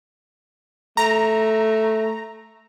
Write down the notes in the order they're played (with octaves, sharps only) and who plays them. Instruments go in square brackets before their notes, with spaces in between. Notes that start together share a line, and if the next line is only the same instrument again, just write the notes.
[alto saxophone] A3 [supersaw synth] A#5